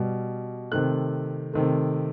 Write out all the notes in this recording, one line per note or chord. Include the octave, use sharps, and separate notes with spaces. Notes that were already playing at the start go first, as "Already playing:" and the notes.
Already playing: B2 G3
C3 D#3 A3 F#6
C3 D#3 A3